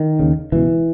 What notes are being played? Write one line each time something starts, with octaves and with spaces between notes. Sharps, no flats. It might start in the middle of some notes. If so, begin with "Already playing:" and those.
Already playing: D#3
D#2 C#3
C#2 B2 E3